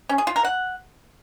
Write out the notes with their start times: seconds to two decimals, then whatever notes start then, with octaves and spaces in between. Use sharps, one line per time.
0.09 C#4
0.18 G#4
0.27 F4
0.36 A#4
0.45 F#5